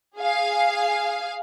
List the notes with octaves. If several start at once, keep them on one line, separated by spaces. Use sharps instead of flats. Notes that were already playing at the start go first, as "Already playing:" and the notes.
G#4 F5